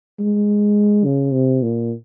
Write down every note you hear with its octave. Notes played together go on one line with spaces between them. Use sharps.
G#3
C#3
C3
A#2